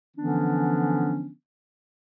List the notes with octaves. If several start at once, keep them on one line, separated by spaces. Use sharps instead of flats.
D3 E3 F3 B3 C#4 D4